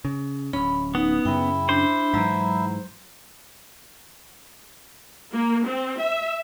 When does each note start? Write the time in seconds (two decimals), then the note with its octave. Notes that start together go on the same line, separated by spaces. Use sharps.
0.05 C#3
0.53 D1 C#4 B5
0.95 B3 D#4
1.25 F#2 C#3 E4 G5
1.69 D4 C5
2.14 G#2 E3 F#3 A#5 E6
5.32 A#3
5.66 C4
6.00 E5